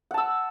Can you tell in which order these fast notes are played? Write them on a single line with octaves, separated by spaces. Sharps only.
F#5 A5 E6